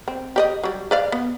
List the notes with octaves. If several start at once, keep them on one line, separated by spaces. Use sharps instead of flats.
C4
G4 D5 D#5
F#3 G3
B4 D5 F5
B3